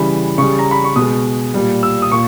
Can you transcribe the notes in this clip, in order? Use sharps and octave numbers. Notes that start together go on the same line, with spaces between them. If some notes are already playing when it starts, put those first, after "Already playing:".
Already playing: C#3 E3 G3 B5
C#3 G3 C#6
A#5
B5
C#6
B2 D#6
G#3
A#2 G3
E6
D#6
A#2 C#6